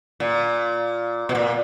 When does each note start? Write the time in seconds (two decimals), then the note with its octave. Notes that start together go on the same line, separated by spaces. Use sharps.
0.20 A#2
1.29 B2
1.35 A#2